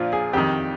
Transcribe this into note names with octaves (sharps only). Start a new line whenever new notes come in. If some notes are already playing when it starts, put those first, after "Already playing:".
Already playing: A#2 F3 D4 F4
G#4
F2 D#3 G4